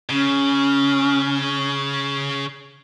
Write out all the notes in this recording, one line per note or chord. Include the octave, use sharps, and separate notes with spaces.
C#3 C#4